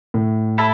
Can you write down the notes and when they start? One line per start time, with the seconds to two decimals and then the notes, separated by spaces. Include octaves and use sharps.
0.14 A2
0.58 E4 A4